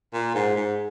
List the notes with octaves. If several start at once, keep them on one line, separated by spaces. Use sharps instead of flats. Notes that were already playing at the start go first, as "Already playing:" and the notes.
A#2
G#2
G#2